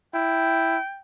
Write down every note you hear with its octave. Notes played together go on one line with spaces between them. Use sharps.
E4 G5